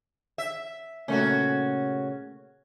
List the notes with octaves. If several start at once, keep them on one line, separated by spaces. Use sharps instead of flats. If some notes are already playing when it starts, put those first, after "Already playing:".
E5
A#2 C#3 A3 C#4 F#4